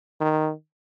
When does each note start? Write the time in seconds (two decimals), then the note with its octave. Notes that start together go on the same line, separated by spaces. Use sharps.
0.21 D#3